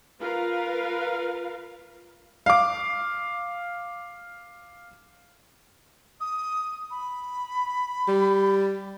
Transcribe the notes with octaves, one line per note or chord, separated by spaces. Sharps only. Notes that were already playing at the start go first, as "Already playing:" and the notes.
F4 A#4 B4 F5
F5 D6
D#6
B5
G3